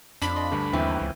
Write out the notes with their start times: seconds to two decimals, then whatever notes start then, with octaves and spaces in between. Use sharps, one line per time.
0.22 F2 D4 B5
0.36 D5 D#5 C6
0.51 D2 G2 D3
0.73 D#2 E3 C4
1.01 C#2